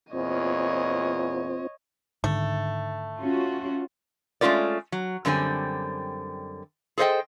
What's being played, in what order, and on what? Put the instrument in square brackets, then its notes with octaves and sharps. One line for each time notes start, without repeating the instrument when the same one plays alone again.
[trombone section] E2 A#2 [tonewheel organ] C4 F4 C5 [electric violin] C#5 D#5
[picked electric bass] G#2 D3 D#3 [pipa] A3
[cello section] C#4 F4 F#4
[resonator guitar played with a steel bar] G#3 A3 C#4 F4 A#4 D5
F#3
F#2 D3 G3 C4 G#5
G#4 A4 C5 D5 D#5 G5